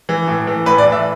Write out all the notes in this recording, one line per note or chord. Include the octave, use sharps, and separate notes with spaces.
E3
A2
E3
A2 B4
D5
E3
E5